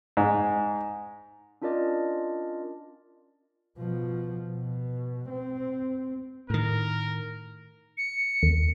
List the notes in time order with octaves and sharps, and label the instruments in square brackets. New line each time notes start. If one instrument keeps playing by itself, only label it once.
[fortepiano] G#2
[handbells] C#4 D4 F4 A#4 D5 D#5
[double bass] B2 F3
B2
C4
[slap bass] A2 D#3 [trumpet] A#4
[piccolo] C#7
[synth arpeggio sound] D#2